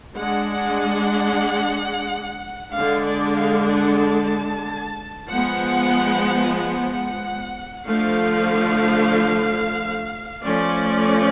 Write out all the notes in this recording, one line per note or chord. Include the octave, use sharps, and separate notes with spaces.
G#3 D4 F#5
D3 G#3 D4 F5
D5
F5
F#5
A5
F3 G#3 B3 F#5
F#5
D3 F3 A3 F5
F3 A3 C#4 D5